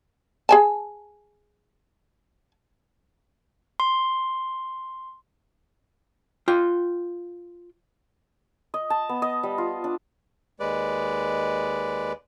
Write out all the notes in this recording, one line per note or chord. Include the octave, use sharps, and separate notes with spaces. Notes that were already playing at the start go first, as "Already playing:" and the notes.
G#4 G#5 A5
C6
F4 G5
D#5
A5
B3
D#5
G3
F4
D4
D#2 G#3 B4 D5